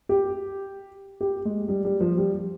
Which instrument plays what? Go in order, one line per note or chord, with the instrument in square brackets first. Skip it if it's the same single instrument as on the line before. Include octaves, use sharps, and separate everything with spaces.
[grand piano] G4
G4
G#3
G3
G3
F3
G3